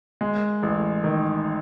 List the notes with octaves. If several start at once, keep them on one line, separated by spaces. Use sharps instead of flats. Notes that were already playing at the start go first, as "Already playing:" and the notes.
G#3
A1
D#3